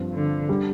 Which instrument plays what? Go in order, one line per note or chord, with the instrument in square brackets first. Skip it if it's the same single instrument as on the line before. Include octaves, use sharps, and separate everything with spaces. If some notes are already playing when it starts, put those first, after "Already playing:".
Already playing: [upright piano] G2 F3 C4
[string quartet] D3
[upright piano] D3 G3